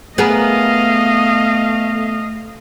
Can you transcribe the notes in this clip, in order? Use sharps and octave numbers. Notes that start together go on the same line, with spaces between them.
A3 B3 G#4 A#4 D#5 F5